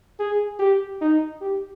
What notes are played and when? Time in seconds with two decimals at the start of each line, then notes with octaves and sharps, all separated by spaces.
0.19 G#4
0.59 G4
1.01 D#4
1.41 G4